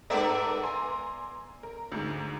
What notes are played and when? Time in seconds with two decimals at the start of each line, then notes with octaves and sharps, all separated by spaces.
0.10 G#2 B3 A4 A#4 D5 E5
0.63 G#5 A#5 C6
1.63 A#4
1.92 D2 G#2